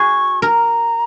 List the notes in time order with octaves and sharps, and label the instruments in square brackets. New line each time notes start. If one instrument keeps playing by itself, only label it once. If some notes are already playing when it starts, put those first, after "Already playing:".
Already playing: [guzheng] F#4 G#4 [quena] C#6
[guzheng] A#4 [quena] A#5